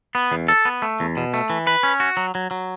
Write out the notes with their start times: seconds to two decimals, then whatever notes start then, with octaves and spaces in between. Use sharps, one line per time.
0.15 B3
0.32 E2
0.48 A4
0.65 B3
0.82 A3
1.00 E2
1.17 B2
1.34 A3
1.50 E3
1.67 B4
1.83 C#4
2.00 F#4
2.17 F#3
2.35 F#3
2.51 F#3